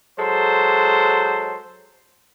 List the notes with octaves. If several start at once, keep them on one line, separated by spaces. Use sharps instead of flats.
F#3 G#3 A4 C5